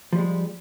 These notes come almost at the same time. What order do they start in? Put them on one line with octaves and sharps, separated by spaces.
F3 G3 G#3